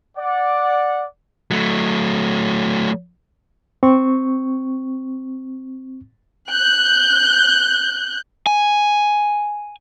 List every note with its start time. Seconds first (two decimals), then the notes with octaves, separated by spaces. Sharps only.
0.18 D5 F#5
1.51 F#3 A3
3.83 C4 C#6
6.50 F#6 G6
8.47 G#5